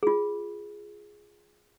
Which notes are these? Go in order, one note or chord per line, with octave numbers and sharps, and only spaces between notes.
F4 G#4